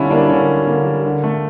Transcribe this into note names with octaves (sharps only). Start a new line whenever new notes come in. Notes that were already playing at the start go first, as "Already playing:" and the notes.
Already playing: D3 G3 C#4 D4 E4 F4
G3 A#3 D4
D3 C#4
G3
D3 A#3
G3
D3
A3